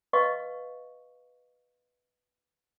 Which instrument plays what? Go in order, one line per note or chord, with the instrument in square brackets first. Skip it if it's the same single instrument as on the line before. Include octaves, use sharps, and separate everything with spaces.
[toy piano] B4 D#5 F5 C#6